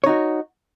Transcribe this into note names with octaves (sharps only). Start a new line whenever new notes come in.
D#4 F#4 C#5